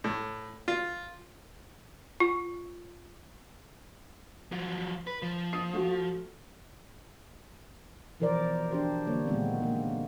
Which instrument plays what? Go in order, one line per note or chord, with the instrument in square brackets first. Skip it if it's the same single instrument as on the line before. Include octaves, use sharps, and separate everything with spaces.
[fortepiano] A2
F4
[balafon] F4
[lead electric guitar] F3 F#3
B4
F3
[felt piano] D#6 C7
A3 F#4
[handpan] B2 E3 F3 A#4 C5 D5
D4 G4 C5
D3 G3 A#3 C#5
A#2 D#3 G#3 A3 B3 C4
A#3